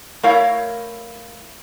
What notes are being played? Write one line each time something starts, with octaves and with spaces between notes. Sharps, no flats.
A3 E4 A#4 C#5 F5